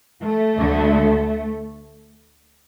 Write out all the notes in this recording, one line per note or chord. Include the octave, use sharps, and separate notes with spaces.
A3
D2 D3